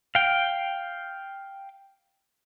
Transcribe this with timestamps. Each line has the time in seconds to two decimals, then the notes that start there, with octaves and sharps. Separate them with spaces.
0.15 F5 G5